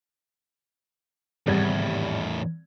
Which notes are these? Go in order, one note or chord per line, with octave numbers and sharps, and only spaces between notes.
G#1 E2 A2 G3 G#6